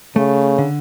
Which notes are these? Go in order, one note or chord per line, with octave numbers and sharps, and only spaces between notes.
C#3 A3
D3